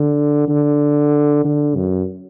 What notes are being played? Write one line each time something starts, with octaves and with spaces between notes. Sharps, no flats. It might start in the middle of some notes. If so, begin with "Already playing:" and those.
Already playing: D3
D3
D3
F#2